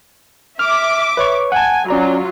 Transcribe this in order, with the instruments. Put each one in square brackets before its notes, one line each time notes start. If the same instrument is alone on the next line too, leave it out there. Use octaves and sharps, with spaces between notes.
[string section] E5 D6 [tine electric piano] F6
[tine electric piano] B4 C#5 C#6
[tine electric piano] F#5 A5 [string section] G#5
[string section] F#3 F4 [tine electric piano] C#4 D5 A#5